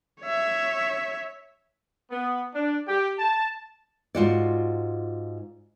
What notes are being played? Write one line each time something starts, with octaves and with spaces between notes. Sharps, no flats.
C#5 E5
B3
D4
G4
A5
G#2 F4 F#4 D5